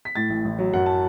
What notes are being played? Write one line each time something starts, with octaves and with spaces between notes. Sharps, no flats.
B6
A2 A6
A1
A1
F#3
F#2 F#5
A5